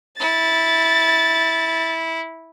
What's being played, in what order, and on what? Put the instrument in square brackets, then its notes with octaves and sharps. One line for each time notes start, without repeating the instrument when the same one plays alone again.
[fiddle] E4 [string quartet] A6